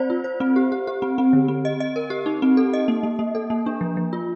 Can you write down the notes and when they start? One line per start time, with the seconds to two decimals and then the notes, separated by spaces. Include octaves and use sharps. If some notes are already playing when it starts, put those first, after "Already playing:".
Already playing: C4 C5 D5
0.10 F4
0.24 C5
0.40 C4
0.56 G4
0.72 G4
0.87 G4
1.02 C4
1.18 C4
1.33 D3
1.48 C4
1.65 D#5
1.80 D#5
1.96 A#4
2.10 G4
2.26 D#4
2.42 C4
2.57 A4
2.73 D#5
2.88 A#3
3.03 A#3
3.19 A#3
3.35 A4
3.50 A#3
3.66 D4
3.81 F3
3.97 F3
4.13 F4